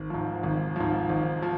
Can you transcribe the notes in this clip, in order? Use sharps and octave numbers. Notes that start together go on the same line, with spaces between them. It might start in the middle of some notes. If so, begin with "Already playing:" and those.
Already playing: G#1
G#2 F3
G#1
G#2 F3
G#1
F3